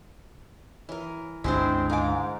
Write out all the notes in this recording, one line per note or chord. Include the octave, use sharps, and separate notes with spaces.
E3 A#4 C#5
G1 C#2 G#3 C4 D4 E4 G4 C5
G#2 A#4 D#5 F5 G#5 D6